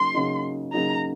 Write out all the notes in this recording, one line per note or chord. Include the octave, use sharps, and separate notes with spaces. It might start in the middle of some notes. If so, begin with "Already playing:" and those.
Already playing: C#3 F#3 A#3 D#4 C6
C#3 F#3 A#3 D#4 G#4
C#3 F#3 A#3 D#4 G#4 A#5